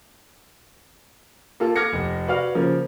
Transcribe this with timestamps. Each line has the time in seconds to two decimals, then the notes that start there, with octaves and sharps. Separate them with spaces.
1.60 A#3 F4 A4
1.76 D6 F6 G#6 A#6 C#7
1.93 F1
2.28 F#4 B4 D5 F5 F6
2.55 C#3 F3 A#3 A#4